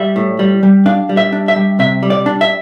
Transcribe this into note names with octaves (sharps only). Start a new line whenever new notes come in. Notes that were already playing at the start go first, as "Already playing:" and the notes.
Already playing: G3 E5
A2
G3
G3
D4 F5
G3
E5
D4
E5
G3
C3 E5
G3
D5
D4
E5